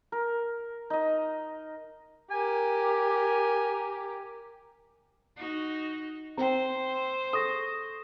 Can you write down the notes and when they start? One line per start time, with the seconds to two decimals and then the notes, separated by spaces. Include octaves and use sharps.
0.12 A#4
0.90 D#4 D#5
2.31 G4 A#4 G#5
5.36 D#4 F#4
6.37 C4 C5 G5 A#5
7.33 A4 C#6 D#6 A#6